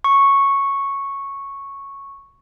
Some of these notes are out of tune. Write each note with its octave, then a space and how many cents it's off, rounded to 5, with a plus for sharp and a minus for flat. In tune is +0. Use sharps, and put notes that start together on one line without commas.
C#6 -5